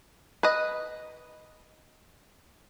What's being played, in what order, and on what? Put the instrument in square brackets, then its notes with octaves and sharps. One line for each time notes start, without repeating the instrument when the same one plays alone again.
[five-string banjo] B4 D#5